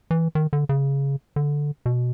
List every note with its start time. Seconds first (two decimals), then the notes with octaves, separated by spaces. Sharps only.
0.11 E3
0.35 D#3
0.53 D3
0.69 C#3
1.36 D3
1.86 B2